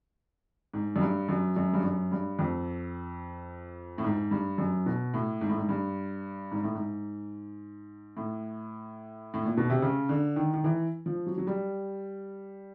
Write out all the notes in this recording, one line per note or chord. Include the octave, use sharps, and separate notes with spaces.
G#2
F#2
G2
F#2
F#2
G2
F#2
G2
F2
A2
G#2
G2
F#2
B2
A2
G#2
A2
G#2
G2
G#2
A2
G#2
A2
A2
A#2
B2
C3
C#3
D3
D#3
D#3
E3
F3
F#3
F#3
G3